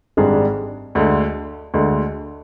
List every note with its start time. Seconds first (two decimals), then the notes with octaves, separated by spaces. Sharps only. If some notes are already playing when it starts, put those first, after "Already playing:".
0.17 G#1 G#2 G3 D4 G#4
0.95 D2 D3 G#3
1.74 D2 D3 G#3